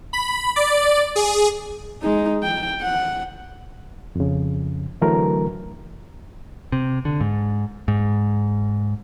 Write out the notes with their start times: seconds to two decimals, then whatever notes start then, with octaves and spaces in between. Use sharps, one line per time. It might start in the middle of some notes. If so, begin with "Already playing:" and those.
0.13 B5
0.56 D5
1.16 G#4
2.02 G#3 D#4
2.44 G5
2.82 F#5
4.16 F2 C#3
5.01 D3 E3 F#3 A3 A#4
6.72 C3
7.05 D3
7.21 G#2
7.88 G#2